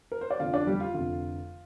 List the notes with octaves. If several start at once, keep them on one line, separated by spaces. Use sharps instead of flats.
A#4
C5
D5
F1 F2 D3 F4 F5
D4 D5
G3 G4
F4
F1 F2 D3 F4